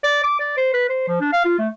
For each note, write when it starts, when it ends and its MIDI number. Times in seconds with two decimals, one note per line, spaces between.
0.04 0.21 74
0.24 0.39 86
0.40 0.56 74
0.57 0.72 72
0.74 0.89 71
0.89 1.04 72
1.08 1.20 53
1.20 1.31 62
1.33 1.41 77
1.45 1.58 65
1.59 1.68 57